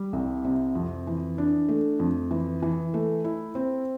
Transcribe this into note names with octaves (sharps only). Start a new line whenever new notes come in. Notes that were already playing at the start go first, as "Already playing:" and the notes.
Already playing: G3
C2
C3
F2
E3
D4
A3
F2
E3
E3
A3
E4
C4